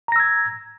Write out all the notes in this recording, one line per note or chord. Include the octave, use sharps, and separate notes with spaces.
A#5 E6 G#6 A#6